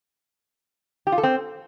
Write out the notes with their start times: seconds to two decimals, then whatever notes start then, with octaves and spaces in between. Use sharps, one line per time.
1.07 G4
1.12 F4
1.18 A4
1.23 C4